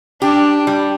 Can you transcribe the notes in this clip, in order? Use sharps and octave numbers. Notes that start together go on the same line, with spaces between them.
D4 G4
G3